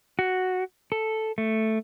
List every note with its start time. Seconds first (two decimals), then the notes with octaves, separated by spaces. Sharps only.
0.19 F#4
0.92 A4
1.38 A3